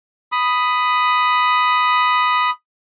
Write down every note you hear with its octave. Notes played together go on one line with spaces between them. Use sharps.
B5 D#6